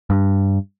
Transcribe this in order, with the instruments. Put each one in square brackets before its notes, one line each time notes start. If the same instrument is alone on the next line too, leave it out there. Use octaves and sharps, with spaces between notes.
[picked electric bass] G2